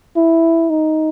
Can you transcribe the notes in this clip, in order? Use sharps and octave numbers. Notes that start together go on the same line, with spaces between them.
E4
D#4